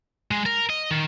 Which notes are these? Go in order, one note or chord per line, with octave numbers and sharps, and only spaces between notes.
G#3
A#4
D#5
D#3